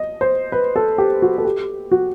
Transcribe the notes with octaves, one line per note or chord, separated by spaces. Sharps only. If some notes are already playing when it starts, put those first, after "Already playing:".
Already playing: D#5
C5
B4
A4
G4
F#4
A4
G4
F#4